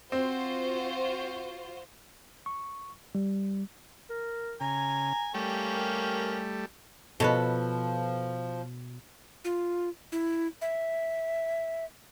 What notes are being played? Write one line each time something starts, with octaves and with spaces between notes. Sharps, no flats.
C4 F4 F#4 C5
C#6
G3
A#4
C#3 G#5 A#5
G3 A3 A#3 C#4 G4
A#4
B2 F3 A4 B4 C#5
F4
E4
E5